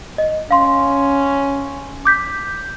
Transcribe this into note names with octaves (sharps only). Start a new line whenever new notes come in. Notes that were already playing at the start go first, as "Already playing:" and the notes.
D#5
C#4 F5 C6
D6 G6 B6